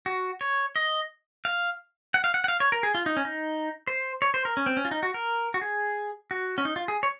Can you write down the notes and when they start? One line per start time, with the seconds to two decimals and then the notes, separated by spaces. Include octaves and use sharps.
0.06 F#4
0.41 C#5
0.76 D#5
1.45 F5
2.14 F#5
2.24 F5
2.34 F#5
2.44 F#5
2.48 F5
2.60 C#5
2.72 A#4
2.83 G#4
2.95 F4
3.06 D#4
3.17 C#4
3.25 D#4
3.87 C5
4.22 C#5
4.34 C5
4.45 A#4
4.57 C#4
4.66 C4
4.77 C#4
4.85 F4
4.91 D#4
5.03 F#4
5.14 A#4
5.54 F#4
5.61 G#4
6.31 F#4
6.58 C#4
6.65 D#4
6.76 F4
6.88 G#4
7.03 C#5